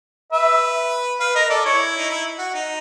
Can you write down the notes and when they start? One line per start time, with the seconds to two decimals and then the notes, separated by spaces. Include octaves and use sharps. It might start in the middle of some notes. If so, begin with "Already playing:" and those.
0.32 B4 E5
1.20 B4 F5
1.36 A#4 D#5
1.50 A4 D5
1.65 E4 C#5
1.98 D#4
2.10 E4
2.39 F#4
2.54 D#4